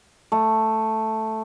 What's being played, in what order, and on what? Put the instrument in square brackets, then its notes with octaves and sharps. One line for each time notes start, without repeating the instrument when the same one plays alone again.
[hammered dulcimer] A3